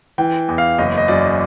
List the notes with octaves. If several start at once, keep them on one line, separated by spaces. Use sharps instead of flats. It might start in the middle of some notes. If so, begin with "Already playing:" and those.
E3 G5
E2
F5
F#1 D#5
D#5
F#2 D5